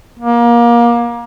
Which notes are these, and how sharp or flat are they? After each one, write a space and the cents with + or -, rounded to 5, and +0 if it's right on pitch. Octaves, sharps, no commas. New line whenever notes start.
A#3 +25